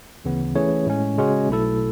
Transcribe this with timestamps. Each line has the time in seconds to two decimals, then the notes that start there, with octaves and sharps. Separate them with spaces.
0.25 D2 C#3 E3 B3
0.55 E3 A3 C#4 G#4 C#5
0.86 A2 G#3 C#4
1.17 C#3 G#3 C#4 F#4
1.49 B1 B2 A3 E4 A4